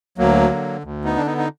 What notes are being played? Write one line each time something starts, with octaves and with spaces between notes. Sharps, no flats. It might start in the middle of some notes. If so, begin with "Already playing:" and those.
D2 F#3 A#3
D3
D2
B3 D#4
D3 D4
B3 D#4
D#4